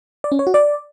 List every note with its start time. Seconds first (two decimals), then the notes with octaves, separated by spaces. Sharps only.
0.24 D5
0.32 C#4
0.39 C#5
0.47 F#4
0.54 D5